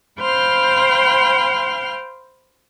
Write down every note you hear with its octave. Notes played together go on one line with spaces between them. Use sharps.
C5 F5 G5 B5 C6 F6